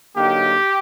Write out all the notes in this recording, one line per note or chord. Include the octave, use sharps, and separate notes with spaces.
D3 F#3 A#3 D#4 G4